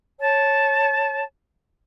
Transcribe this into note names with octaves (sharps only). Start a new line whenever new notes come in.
C#5 A5